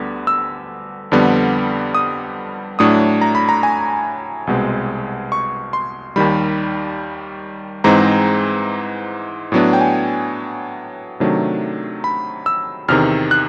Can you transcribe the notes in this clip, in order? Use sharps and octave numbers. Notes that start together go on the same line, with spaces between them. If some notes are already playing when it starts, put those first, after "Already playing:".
Already playing: D2 D3 G3 B3
E6
F2 D3 G3 B3
D#6
A2 F#3 A3 D4 D#6
A#5
B5
A#5
G#5
C2 B2 G#3 C4
C#6
C6
D#2 D#3 G3 B5
G#2 E3 G#3 C4 A#5
A2 F#3 B3 D4
G5
G#5
C3 D#3 F#3 A3 D4
B5
E6
E2 C3 D#3 F6
F#6